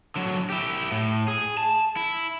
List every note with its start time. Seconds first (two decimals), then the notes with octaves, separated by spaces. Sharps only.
0.16 D3 F#3
0.50 E4 G4
0.92 A2
1.28 G#4
1.57 A5
1.97 E4